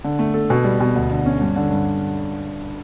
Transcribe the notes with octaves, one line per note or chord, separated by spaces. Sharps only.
D3
A3
A4
B2
G3
B2
D2
D3
C#4
G2
D3
G2